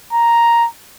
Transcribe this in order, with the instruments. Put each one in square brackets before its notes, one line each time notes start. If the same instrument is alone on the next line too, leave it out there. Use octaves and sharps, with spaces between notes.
[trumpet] A#5